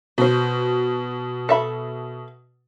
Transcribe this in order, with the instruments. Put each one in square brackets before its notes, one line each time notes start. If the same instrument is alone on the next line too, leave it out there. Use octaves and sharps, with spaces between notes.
[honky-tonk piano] B2 [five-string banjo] F#4 C5
[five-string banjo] A4 E5 B5